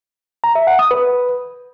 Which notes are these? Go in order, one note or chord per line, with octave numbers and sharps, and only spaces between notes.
A#5
E5
F#5
D#6
B4